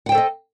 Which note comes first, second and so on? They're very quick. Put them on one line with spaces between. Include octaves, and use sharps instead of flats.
F#5 G5 C5 A4 D#5